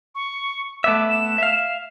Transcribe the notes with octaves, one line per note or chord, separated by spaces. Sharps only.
C#6
A3 B3 E5 D6
E7
E5 F5